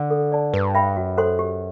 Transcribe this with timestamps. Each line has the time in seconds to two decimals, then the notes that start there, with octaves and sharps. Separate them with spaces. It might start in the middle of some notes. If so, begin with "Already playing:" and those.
Already playing: D3
0.11 A4
0.32 D5 A5
0.53 G2 B4
0.75 E5 G5 B5
0.97 F#2 F#4
1.17 A4 C5 F#5 C6
1.39 G4